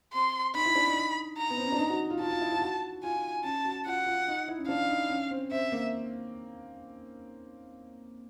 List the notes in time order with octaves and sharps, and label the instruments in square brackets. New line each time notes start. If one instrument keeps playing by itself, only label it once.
[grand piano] C4 [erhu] C6
[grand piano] D#4 [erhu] B5
[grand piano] E4
D4
D#4
[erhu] A#5
[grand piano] B3
C4
C#4
D4
D#4
F#4
F4
[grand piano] F4 [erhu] A5
[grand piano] F4
E4
F4
F#4
[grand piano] F4 [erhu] G#5
[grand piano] C#4 [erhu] A5
[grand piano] F#4
[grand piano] F4 [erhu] F#5
[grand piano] F4
D#4
E4
C#4
[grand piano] D4 [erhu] F5
[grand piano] D#4
C#4
C4
[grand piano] C4 [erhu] E5
[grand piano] A#3